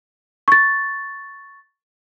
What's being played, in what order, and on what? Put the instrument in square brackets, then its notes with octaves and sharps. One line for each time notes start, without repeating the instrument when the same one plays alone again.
[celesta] C#6 A6